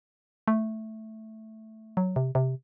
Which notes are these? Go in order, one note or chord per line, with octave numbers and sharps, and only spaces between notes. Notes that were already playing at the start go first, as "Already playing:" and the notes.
A3
F#3
C3
C3